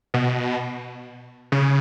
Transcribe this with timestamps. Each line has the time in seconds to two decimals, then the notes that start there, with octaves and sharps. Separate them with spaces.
0.14 B2
1.52 C#3